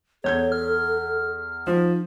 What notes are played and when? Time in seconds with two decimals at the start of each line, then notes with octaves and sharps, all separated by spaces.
0.24 E2 A4 C#5 G6 G#6
0.52 F6
1.67 F3 D#4